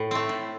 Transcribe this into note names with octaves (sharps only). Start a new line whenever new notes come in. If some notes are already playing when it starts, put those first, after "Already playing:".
Already playing: A2
A3 C4
A2